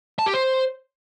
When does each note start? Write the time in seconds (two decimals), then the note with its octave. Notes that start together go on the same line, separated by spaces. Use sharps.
0.19 A5
0.26 G4
0.34 C5